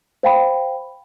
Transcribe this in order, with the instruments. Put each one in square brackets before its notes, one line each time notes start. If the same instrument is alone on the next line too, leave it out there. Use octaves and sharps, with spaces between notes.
[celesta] C5 F5 G5 B5